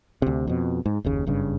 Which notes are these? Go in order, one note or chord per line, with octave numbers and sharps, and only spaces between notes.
D2 C3
F2 B2
G#2
F#1 D#2 C#3
F#1 G2 C#3